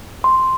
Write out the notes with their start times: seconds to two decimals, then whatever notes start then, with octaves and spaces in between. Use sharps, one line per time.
0.24 C6